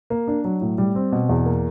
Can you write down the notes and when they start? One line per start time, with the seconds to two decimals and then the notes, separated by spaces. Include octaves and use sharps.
0.10 A#3
0.28 D4
0.44 F#3
0.61 A2
0.78 G3
0.95 C4
1.12 B2
1.29 E2
1.46 A#3